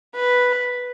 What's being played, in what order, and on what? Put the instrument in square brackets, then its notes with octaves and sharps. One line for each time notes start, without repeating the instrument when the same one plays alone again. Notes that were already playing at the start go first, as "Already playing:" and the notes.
[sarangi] B4